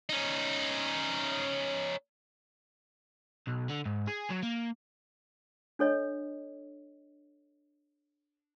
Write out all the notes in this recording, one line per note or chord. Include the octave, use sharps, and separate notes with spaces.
C#4 D#4
B1
D3
G#2
G#4
F#3
A#3
D4 A4 C#5 D#5